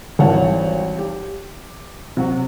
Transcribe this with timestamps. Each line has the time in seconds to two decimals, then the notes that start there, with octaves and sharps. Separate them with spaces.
0.19 G#1 E3 G3 C#5 F#5 A5
0.98 G4
2.17 C3 F#3 F#4